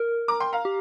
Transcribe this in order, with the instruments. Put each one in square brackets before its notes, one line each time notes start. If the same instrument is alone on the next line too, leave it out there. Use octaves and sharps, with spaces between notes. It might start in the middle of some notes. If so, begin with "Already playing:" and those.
Already playing: [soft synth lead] A#4
[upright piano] A#5 D6
G5 C6
F5 A#5
[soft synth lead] G4